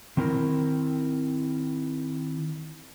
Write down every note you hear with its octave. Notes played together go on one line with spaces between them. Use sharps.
D#3 C4 E4 A#4